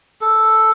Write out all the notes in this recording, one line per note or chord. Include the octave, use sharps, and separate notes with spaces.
A4